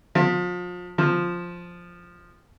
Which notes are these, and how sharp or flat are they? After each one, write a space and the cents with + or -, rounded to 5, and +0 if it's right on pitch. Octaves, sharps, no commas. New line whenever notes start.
F3 +35
F3 +5